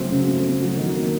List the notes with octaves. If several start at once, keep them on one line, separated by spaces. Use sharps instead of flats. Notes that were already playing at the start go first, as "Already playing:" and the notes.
Already playing: C#3 F#3 A3 C4
C#3
A3
C4
F#3
D#3
A#3